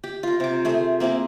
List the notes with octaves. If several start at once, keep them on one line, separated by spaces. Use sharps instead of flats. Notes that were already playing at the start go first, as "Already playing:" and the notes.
G4
F4 A#4
C3 D6
A3 G#4 C5
A#3 C4 E4 G#4